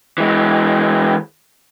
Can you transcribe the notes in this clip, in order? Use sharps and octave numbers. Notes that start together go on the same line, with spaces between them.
E3 G#3